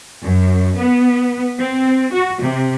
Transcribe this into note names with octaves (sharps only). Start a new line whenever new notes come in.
F#2
B3
C4
F#4
C3